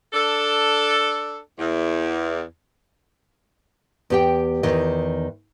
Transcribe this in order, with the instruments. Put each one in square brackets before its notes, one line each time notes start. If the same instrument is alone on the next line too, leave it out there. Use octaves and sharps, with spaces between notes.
[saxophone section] D4 A4
E2
[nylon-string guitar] E2 G4 G5
E2 D#3 D#5